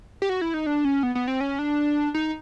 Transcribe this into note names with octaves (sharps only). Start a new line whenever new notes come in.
G4
F#4
E4
D#4
D4
C#4
B3
B3
C4
C#4
D4
D#4